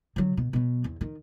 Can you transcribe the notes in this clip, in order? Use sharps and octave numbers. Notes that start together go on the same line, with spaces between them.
D3 F#3
B2
B2 F#3
E2
D#3